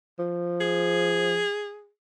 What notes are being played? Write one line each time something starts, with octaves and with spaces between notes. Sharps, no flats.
F3
G#4